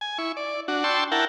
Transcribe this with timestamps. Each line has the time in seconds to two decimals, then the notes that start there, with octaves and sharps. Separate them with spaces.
0.01 G#5
0.18 E4 C#6
0.37 D5
0.68 D4 F#4
0.84 D5 G5 A5 C6 C#6 E6
1.12 E4 A#4 F#5 G5 A5